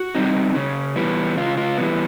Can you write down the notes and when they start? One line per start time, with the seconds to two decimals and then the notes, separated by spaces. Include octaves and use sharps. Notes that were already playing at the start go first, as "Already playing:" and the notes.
Already playing: F#4
0.15 G3 C4 D#4
0.55 C#3
0.96 E3 G3 B3
1.37 C#3 F4
1.58 F4
1.78 E3 G3 B3